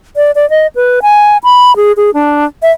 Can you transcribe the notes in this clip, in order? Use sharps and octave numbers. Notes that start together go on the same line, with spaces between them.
D5
D5
D#5
B4
G#5
B5
G#4
G#4
D4
E5